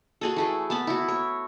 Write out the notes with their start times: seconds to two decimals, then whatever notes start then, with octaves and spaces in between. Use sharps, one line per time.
0.21 F#4 G#4 A4
0.36 E3 A3 G#4
0.70 B3 A5 B5
0.87 E4 F#4
1.08 C#5